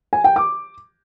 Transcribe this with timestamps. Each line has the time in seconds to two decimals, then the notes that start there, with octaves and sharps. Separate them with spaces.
0.13 G#5
0.24 G5
0.36 D6